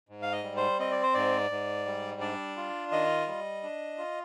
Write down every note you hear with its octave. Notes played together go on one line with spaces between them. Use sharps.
G#2
F5
D#5
G3
C5
C4 D#5
D5
C5
G#2 D5
G#2
G3
D4 D5
F4
D#3 D#5
G3
D4
F4